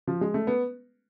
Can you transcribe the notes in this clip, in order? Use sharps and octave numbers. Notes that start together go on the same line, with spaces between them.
F3
G#3
A3
B3